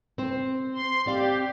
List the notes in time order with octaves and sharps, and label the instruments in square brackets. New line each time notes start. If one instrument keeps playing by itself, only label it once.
[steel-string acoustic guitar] C4 C5
[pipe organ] C6
[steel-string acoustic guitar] C4 D5 F5 [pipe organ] G4